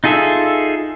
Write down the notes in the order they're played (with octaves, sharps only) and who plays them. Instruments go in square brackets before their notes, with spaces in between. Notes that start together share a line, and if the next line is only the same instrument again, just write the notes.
[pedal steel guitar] D#4 F4 G#4 A4 E5